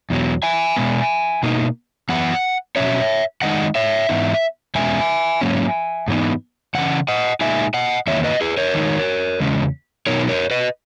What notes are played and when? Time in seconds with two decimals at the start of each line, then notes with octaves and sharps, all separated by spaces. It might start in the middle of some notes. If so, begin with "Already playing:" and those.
0.10 E2 B2 F#3
0.43 E5 G#5
0.76 B2 G#3 B3
1.43 B2 A#3 D#4
2.09 F#2 E3 B3 F#5
2.76 B2 F#3 C#4 C#5 E5
3.42 D#3 G#3 D#4 D#5 F#5
3.75 C#5 E5
4.09 G#2 E3 B3 D#4
4.75 E2 B2 G#3 C#4 E5 G#5
5.41 G#2 F#3 A#3 C#4
6.08 G#2 E3 B3 D#4
6.75 C#3 E3 C#4 F#5
7.08 D#5 F#5
7.41 A#2 G#3 D#4 E5 G#5
7.74 D#5 F#5
8.07 E2 D#3 A#3 D#4 C#5 E5
8.24 B4 D#5
8.41 G#4 B4
8.57 A#4 C#5
8.74 D#3 G#3 D#4
9.40 E2 C#3 G#3 C#4
10.07 B2 F#3 B3 D#4 A#4 C#5
10.29 A#4 C#5
10.51 B4 D#5